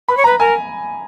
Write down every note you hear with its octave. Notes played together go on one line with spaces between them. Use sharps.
B4 B5
C#5
B4 A#5
A#4 G#5